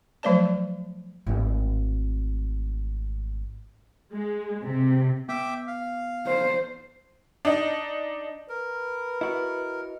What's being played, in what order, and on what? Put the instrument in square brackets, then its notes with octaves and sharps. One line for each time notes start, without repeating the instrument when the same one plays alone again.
[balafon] F3 F#3 A3 C5 D5 A5
[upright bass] G#1 A2
[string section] G#3
C3
[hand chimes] B3 [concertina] E5 G5 D6
[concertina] F5
[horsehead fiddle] C5
[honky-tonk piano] D4 D#4
[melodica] A#4 [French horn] B4
[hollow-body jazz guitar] E4 F#4 [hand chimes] D#5